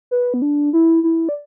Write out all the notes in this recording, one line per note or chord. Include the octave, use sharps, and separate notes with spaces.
B4
B3
D4
E4
E4
D5